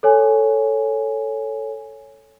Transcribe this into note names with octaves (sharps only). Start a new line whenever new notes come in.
A4 C#5 G#5